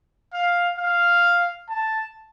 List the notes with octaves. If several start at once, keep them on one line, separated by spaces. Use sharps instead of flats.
F5
F5
A5